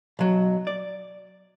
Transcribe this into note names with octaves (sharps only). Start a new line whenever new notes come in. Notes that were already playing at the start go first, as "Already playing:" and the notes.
B1 F#3
D5